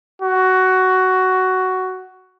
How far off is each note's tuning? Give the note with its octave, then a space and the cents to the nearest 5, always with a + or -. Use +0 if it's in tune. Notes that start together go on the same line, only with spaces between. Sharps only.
F#4 +10